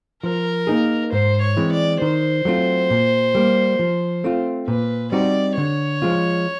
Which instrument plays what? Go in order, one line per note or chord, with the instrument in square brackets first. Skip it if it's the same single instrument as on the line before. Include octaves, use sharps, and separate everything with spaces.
[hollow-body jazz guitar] F3 [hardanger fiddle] A#4
[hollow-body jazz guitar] A#3 D#4 G#4
[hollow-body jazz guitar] G#2 [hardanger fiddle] C5
[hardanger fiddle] C#5
[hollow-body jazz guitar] E3 G#3 C4
[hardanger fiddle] D5
[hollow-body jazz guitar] D#3 [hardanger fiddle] C5
[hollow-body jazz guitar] F#3 A3 C4 F4
A#2
G3 A#3
F3
A3 C4 F4
[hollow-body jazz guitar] A#2 [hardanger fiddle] B4
[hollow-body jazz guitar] G3 C4 D#4 F#4 [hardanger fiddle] D5
[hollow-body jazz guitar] D3 [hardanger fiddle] C#5
[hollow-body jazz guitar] F3 G#3 C#4 F4